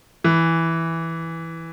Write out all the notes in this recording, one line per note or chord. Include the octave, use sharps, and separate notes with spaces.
E3